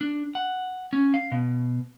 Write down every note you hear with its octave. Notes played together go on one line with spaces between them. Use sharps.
D4
F#5
C#4
F5
B2